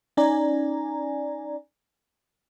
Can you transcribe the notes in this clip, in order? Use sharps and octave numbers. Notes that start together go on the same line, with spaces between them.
C#4 D#4 D5 G#5 A#5